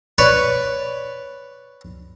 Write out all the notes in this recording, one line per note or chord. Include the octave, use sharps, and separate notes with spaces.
B4 C#5 D5